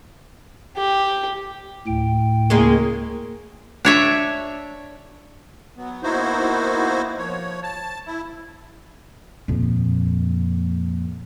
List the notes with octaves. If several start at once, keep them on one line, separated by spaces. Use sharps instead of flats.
G4
D2 A2 G5
C#3 G#3 A#3
D4 C#5 E5
F#3 B3
A#3 B3 D#4 E4 F#4 C5
F3 C#5
A5
E4
F2 A#2